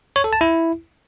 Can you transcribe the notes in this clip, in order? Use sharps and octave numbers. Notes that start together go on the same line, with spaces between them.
C#5
A4
A5
E4